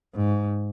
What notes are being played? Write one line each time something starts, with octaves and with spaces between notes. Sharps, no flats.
G#2